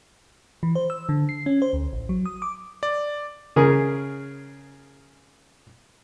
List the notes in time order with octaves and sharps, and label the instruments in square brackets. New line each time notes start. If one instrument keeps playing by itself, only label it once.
[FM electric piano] E3
C5
E6
D3
C7
C#4
C5
D2
A1
F#3
D#6
D6
[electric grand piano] D5
[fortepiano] C#3 G#4 A#4